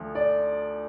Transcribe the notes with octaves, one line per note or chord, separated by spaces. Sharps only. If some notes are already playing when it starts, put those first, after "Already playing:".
Already playing: D2 F3
D5